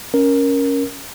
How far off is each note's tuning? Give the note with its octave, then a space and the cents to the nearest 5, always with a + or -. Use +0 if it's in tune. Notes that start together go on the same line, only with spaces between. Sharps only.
C#4 +0 A#4 +10